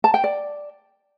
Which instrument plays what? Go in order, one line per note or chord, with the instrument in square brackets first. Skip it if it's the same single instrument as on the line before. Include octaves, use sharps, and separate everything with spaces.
[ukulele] A5
G5
D5